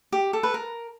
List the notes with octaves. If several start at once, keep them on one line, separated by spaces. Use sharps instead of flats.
G4
A4
B4
A#4